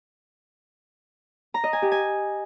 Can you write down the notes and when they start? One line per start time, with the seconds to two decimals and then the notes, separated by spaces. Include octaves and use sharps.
1.54 A#5
1.64 D#5
1.73 G#5
1.82 G4
1.92 G#5